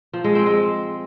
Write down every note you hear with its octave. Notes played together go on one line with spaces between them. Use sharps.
F3
G#3
C4
G#3